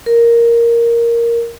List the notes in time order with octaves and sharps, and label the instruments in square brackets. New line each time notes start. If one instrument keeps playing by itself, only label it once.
[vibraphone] A#4